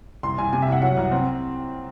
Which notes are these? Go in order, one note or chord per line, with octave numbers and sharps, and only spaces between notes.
C2 C6
C2 G#5
C3 G#5
E5
C2 F#5
F#3 F#5
C2
C4